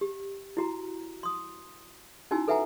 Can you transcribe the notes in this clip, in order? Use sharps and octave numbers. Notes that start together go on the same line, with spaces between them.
G4
E4 F#4 A#5
C6 D#6
C#4 D#4 E4 F#4 G#5 E6
A4 B4 E5 F#5 G#5 A#5